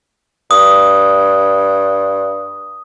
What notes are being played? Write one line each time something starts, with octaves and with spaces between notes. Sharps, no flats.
G2 D#6